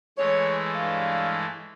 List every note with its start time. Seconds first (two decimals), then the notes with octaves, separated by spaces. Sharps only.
0.18 E3 G#3 A3 C#5
0.75 G2 C#5 F5